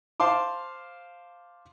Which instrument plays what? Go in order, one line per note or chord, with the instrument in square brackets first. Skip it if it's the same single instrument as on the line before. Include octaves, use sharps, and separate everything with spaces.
[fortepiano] C5 F5 A5 C6 D6